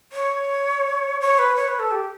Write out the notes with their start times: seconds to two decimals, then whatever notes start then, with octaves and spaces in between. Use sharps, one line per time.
0.12 C#5
1.20 C#5
1.39 B4
1.56 C#5
1.68 B4
1.79 A4
1.91 G4